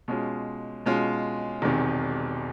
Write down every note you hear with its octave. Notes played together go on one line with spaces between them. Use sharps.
B2 G#3 C#4 F4
B2 G#3 C#4 F4
E1 E2 C3 D#3